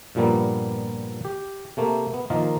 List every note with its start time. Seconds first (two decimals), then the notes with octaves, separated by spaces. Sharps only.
0.15 G2 A#2 F3 G3 A#3 B3
1.25 G4
1.77 C3 A3 A#3
2.14 B3
2.30 D#3 F3 A#3 F4 A#4 D#5